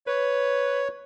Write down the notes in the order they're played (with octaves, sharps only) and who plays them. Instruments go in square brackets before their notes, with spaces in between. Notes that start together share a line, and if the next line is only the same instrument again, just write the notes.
[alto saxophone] B4 [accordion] C#5